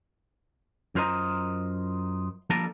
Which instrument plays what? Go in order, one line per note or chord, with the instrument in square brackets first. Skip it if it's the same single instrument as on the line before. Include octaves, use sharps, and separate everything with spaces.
[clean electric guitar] F#2 F4 A#4 C5 D#5 A#5
F3 G3 A#3 D4 A4 A#4